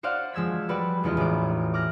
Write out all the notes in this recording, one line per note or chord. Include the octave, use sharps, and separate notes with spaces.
F#4 C5 D5 F5 F#5
F3 G#3 E6 G#6 B6
G3 F#4 B4 D5
E1 G#3 B3 E4 F4 D#5
A1 G#4 D6
D6 F6 F#6 A#6